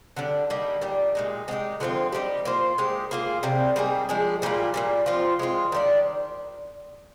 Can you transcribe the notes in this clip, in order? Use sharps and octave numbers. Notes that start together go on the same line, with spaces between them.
D3 G3 D4
G3 A#3 D#4
A#2 G3 D4 G4
A#2 G#3 D#4
G#3 C4 D#4 G4
D3 F3 C4 F4
G3 A#3 D#4 G4
A#3 F4 C5
G#3 D#4 G4
A#3 F4 G#4
C3 G3 C4
G3 A#3 D#4 G#4
F3 G#3 D4 G#4
A#2 G3 A#3 F4
A#2 G3 A#3
F3 C4 F4
G#3 C4 F4
D#3 G3 D4